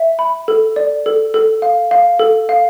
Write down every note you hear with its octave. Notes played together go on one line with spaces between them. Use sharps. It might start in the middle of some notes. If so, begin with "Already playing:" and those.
Already playing: E5
B5
A4
D5
A4
A4
F5
F5
A4
F5